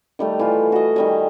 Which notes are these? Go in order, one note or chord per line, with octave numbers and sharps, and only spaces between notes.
D#3 G3 A3
E3 F4
F#4 D#5
D#3 G3 G#5